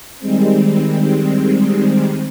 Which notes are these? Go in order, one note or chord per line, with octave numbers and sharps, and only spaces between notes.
D#3 G3 G#3 C4